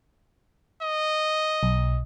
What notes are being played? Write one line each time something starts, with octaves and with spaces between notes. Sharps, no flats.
D#5
B1